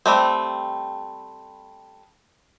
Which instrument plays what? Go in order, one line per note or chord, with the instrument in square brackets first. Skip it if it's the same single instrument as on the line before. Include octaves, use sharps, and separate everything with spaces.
[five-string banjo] G3 A3 C4